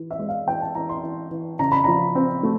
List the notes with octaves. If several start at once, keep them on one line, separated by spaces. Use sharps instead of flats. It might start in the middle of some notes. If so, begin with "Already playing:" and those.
Already playing: E3
E5
G#3
F5
E3 G5
A5
E3 A#5
C6
E3
E3
C#3 A#5
B5
F3 A#5
C4
A3